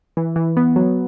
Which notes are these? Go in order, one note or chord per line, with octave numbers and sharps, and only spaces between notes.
E3
E3
B3
F#3